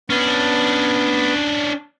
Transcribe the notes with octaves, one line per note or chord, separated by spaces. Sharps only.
B3 C#4 D4